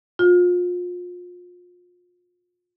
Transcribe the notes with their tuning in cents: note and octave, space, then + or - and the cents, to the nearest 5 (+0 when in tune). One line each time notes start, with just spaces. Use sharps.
F4 +30